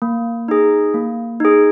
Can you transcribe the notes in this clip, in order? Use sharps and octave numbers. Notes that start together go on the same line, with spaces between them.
A#3
D#4 G#4
A#3
D#4 G#4